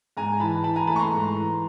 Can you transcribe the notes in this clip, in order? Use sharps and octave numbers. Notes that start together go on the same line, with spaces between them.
G#2 G#5 A#5
E3 A5 B5
E3 A5 B5
G#5 A#5
A3 A5 B5
C#6
A#5 C6
G#2
E3